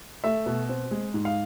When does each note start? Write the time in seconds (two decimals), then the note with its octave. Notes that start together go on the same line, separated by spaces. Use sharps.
0.24 A3 E5
0.46 B2
0.69 C4
0.91 G#3
1.14 G#2
1.25 F5